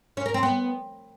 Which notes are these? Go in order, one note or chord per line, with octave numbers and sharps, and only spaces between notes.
C#4
A#4
C4
B3